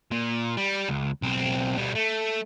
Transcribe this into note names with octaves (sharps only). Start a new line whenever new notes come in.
A#2
G3
C#2
B1 C4
B2 G3
A3